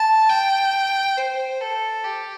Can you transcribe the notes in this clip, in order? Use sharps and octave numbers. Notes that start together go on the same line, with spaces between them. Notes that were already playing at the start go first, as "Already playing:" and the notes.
Already playing: A5
G5
C5
A4
G4